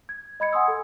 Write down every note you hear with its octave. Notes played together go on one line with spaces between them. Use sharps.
G#6
D#5 B5 G#6 C#7
F#5 G#5 C6 D#6 E6
A4